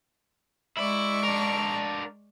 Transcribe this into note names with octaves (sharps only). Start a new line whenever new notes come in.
G#3 E4 D5 C#6
D4 A#4